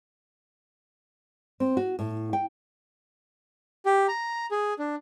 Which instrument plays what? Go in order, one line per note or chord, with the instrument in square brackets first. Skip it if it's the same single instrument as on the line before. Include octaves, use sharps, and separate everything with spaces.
[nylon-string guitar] C4
F#4
A2
G5
[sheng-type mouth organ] G4
A#5
G#4
D4